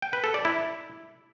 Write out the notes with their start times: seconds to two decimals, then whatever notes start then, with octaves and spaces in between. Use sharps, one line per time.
0.02 G5
0.13 B4
0.24 A4
0.34 D5
0.45 E4